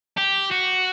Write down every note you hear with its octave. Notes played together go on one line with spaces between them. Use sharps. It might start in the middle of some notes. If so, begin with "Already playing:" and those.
G4
F#4